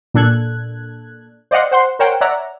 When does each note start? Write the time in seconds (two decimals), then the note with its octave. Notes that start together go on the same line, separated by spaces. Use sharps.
0.14 A#2 D4 A4 F#6 G#6
1.51 C5 D5 D#5 F5 F#5 C6
1.71 C5 F#5 C6
1.99 A#4 C5 C#5 F#5 G5
2.21 C#5 D5 E5 F#5 A#5